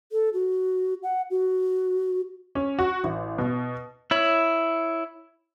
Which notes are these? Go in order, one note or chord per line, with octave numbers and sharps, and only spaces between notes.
A4
F#4
F#5
F#4
C#4
F#4
A1
B2
E4 C#5 B5